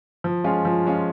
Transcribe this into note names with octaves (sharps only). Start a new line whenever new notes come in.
F3
G#3 C#4 F4
F3
G#3 C#4 F4